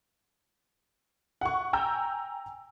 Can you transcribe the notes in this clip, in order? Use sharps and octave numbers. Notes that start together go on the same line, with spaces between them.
F#5 C#6
G5 G#5 A#5 E6 G6